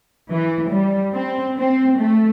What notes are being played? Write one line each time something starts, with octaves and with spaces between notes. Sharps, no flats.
E3
G3
C4
C4
A3